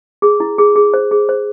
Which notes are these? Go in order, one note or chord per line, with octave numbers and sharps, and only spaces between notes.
G#4
E4
G#4
G#4
C5
G#4
C5